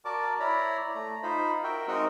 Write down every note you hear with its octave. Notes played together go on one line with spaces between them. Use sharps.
F#4 A#4 D5 A5 D6
E4 C#5 D5 A#5 B5
A3 A#5
D#4 F4 C5 B5
F#4 A#4 E5 G5
G#3 C4 D#4 F#4 A#4 F#5